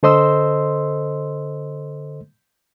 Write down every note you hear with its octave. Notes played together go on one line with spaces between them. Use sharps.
D3 A4 C5 D#5 C6 E6